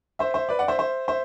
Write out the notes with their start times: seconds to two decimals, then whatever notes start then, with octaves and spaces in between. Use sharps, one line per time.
0.19 C5 E5
0.34 C5 E5
0.49 B4 D5
0.59 D5 F#5
0.68 C5 E5
0.78 C5 E5
1.08 C5 E5